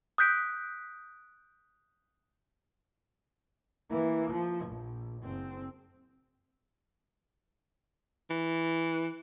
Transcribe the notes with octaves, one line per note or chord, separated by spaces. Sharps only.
D#6 F#6 G6 B6 D7
E3 A#3
F3
A#1
F#1 C4
E3